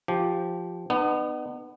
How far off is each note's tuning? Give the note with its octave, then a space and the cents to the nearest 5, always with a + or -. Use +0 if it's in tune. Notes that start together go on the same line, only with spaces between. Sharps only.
F3 +0 G4 -5
B3 +15 D#4 -40